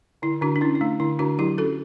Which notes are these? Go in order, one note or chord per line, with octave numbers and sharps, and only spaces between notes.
D3 E4
D3 D4 F#4
D4
C#4 E4
E4
A3 D4
D3 E4
D3 D4 F#4
F#3 E4 G4
C#4 F#4 A4